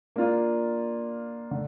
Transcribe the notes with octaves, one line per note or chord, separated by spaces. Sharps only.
A#3 D4 F4
D3